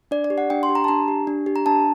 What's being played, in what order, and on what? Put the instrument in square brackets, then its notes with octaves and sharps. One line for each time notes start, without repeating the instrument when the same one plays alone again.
[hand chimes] D4 D5
D5
G4
F#5
D4 G5
C6
G4
A#5
A5
D4 A#5
G4
D4
G4
A#5
D4 A5